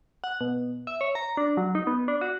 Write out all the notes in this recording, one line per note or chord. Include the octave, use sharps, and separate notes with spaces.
F#5
B2
E5
C#5
A#5
D4
F#3
D#4
B3
D4
F#4